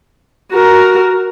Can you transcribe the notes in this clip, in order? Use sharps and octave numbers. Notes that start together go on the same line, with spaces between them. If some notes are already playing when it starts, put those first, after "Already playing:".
F#4 A#4